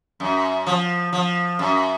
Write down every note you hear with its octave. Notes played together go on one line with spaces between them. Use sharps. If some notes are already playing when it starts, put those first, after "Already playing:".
F#2
F3
F3
F#2